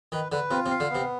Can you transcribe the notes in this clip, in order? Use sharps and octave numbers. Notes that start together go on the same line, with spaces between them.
D#3 B4
D3 B4
C3 F4
C3
F5
D3
C3 B3